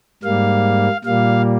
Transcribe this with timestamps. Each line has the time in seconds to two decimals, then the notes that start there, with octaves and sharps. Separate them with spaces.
0.23 G#2 G3 A#3 F5
1.05 A#2 G3 A#3 F5